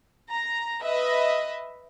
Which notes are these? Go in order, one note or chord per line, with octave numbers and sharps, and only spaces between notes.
A#5
B4 D#5 E5